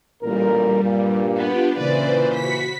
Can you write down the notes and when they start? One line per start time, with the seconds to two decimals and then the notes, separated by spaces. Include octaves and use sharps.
0.23 A1 A#2 G3 A#4
0.84 G2 A#2
1.37 B3 D4 F4 G4
1.78 A#2 C#3 E3 B4 C5 D5
2.36 F#4 B5 B6 C#7